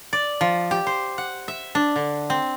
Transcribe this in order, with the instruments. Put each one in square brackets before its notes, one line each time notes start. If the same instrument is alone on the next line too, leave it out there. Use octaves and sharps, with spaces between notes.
[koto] D5
F3
G4
C5
F#5
E5
D4
D3
C4